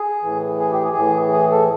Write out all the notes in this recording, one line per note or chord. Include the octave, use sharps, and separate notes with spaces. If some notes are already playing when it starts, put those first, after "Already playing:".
Already playing: G#4
A2 E3
G#4
G4
G#4
A2 E3
G#4
A4